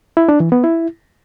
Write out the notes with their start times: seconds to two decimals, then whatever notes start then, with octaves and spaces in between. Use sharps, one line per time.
0.17 E4
0.29 D4
0.40 E3
0.52 B3
0.64 E4